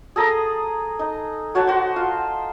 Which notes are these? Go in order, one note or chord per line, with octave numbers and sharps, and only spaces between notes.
G#4 A4 A#5 D#6
D#4
F#4 C#5 F#5 A5
F#4 C5
F4